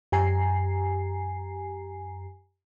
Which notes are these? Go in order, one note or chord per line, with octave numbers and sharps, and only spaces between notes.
F#2 G4 G#5 A#5 C7